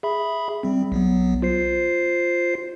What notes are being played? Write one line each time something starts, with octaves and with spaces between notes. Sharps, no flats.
G#4 E5 B5
G3 C4
B1 F#3 B3
F4 C5 C7